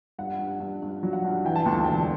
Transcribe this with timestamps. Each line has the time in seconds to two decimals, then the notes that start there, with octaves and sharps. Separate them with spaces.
0.19 G2 F#5
0.39 G2
0.60 G2
0.82 G2
1.03 F#3
1.13 F#5
1.24 G2
1.45 E3 G5
1.56 A5
1.65 D2 G5
1.74 A5
1.85 E1 G5